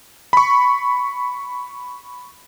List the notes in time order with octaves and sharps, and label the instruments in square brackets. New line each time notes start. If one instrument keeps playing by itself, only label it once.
[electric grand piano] B5 C#6